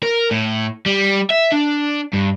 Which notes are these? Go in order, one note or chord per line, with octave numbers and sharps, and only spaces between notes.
A#4
A2
G3
E5
D4
G2